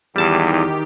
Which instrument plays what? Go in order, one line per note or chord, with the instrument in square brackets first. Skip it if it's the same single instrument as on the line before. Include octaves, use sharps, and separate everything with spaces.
[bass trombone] E2 [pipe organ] D#3 G4 [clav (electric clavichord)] G3 A5